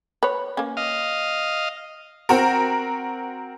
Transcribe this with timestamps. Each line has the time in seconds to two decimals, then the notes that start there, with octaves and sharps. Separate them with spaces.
0.23 B4 C#5
0.57 A#3 C#4
0.77 D#5 F5
2.29 C4 F#4 A#4